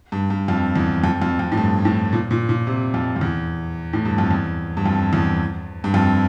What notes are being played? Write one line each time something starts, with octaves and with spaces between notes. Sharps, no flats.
G2
G2
F2
E2
F2
F2
F2
A2
G2
A2
A#2
A#2
A#2
C3
F2
F2
E2
A2
G2
F2
E2
G2
F2
E2
G2
F2